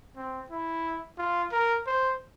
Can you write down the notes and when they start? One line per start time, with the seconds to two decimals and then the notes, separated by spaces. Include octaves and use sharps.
0.16 C4
0.50 E4
1.19 F4
1.52 A#4
1.87 C5